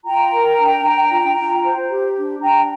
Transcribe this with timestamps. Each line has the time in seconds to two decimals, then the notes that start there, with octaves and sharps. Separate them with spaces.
0.05 F4 G5 A#5
0.32 A#4
0.59 D4
0.84 D4
1.11 F4
1.37 F4
1.64 C5
1.90 G4
2.17 D4
2.42 D4 G5 A#5